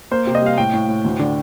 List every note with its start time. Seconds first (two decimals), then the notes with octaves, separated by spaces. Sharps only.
0.11 A#3 C5
0.27 C3
0.35 D#5
0.42 G3 F5
0.58 A2 G5
0.73 A2
0.89 A2
1.05 D2
1.19 D3